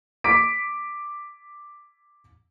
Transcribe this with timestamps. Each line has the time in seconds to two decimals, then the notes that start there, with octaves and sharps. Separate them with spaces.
0.24 D6 B6 D7